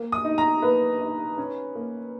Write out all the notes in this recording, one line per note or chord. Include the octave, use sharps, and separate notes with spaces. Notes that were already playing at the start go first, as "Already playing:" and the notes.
Already playing: A#3
D#6
D#4
A#5
A#3 B4
D#4
C#4
A#3